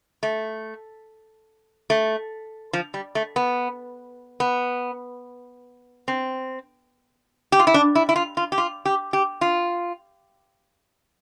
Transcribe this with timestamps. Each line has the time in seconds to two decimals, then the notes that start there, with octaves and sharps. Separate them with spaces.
0.23 A3
1.90 A3
2.73 F3
2.94 G3
3.15 A3
3.36 B3
4.40 B3
6.08 C4
7.52 G4
7.59 F4
7.67 E4
7.74 D4
7.95 E4
8.09 E4
8.16 F4
8.37 F4
8.52 G4
8.58 F4
8.85 G4
9.13 G4
9.41 F4